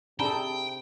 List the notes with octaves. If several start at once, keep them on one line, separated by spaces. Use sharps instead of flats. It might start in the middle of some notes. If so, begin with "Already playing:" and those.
C3 D4 D#4 G#4 A4 G5 A#5 B5